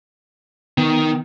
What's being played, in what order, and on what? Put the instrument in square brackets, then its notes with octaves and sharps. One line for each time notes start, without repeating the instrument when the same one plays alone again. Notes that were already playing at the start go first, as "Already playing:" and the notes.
[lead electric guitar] D#3 [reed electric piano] B3